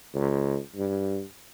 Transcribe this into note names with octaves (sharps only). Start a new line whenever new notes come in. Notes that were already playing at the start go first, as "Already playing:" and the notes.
C#2
G2